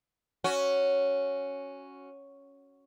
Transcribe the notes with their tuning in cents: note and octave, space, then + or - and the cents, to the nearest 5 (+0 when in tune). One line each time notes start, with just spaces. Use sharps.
C#4 +0 F#4 +0